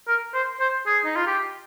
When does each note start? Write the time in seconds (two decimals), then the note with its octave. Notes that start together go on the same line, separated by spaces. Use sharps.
0.07 A#4
0.34 C5
0.60 C5
0.86 G#4
1.05 D#4
1.16 F4
1.27 G4